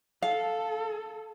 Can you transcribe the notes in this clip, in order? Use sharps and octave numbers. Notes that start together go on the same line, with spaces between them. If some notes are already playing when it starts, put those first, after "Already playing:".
A4 F5